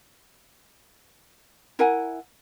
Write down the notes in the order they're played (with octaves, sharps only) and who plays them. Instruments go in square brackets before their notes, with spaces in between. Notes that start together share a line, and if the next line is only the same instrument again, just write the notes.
[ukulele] E4 A#4 F#5 G#5